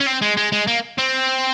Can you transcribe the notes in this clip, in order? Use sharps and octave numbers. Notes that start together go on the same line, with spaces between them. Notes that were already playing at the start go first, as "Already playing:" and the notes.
C#4
C4
G#3
G#3
G#3
A#3
C4